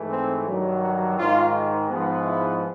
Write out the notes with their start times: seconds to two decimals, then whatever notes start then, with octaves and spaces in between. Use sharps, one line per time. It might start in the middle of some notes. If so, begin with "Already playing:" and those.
Already playing: G#2 E3 A3
0.10 C4
0.46 G2 D#3 F#3
0.82 F#4
1.17 G#2 D#3 G#3 F4
1.88 G#2 F3 G#3 B3
2.25 E4